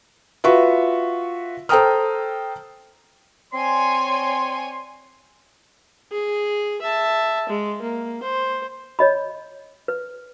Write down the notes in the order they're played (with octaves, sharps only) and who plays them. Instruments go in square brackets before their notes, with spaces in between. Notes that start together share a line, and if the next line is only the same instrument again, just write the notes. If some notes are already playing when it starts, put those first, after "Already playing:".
[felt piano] F4 F#4 B4 E5 C#6
A4 C5 G5 A#5 D#6 F6
[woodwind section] C4 C6 [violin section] C#5 D5 G#5
[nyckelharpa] G#4
E5 A5
G#3
A#3
C5
[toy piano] C#5 D#5 B5
B4